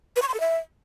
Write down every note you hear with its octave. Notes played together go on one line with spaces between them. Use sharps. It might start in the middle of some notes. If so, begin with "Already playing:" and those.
B4
C#6
C6
A4
E5